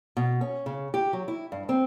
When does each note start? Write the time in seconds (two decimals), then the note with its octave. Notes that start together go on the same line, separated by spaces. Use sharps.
0.17 B2
0.41 C#4
0.66 C#3
0.94 G4
1.13 F#3
1.28 E4
1.52 G2
1.69 C4